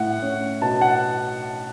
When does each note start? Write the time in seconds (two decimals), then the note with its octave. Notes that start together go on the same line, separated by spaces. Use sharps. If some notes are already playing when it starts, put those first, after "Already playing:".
Already playing: A2 F#5
0.22 C#4
0.62 B2 A5
0.81 F#5